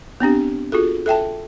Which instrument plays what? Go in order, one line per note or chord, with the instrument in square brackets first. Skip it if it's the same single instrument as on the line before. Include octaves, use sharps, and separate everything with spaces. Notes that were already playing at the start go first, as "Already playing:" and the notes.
[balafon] B3 C4 D4 G4
F4 F#4 G#4 A4
A4 E5 G5 A5